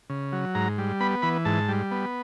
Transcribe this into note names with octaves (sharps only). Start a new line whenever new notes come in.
C#3
F#3
G#2 A#5
G3
B3 B5
E3 B5
G#2 A5
G3
B3